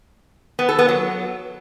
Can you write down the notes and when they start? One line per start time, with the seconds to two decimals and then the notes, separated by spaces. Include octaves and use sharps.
0.59 B3
0.69 A4
0.79 B3
0.89 F#3